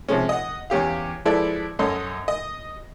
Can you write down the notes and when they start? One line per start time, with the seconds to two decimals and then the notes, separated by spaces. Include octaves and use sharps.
0.09 C3 F3 G#3 C#4
0.29 D#5 F#5
0.70 E2 C#4 G4 F5
1.25 F3 G#3 E4 A4 B4 D5
1.79 F#2 C#4 A4 D#5 C6
2.28 D#5